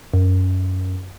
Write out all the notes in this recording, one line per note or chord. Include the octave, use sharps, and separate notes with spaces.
F#2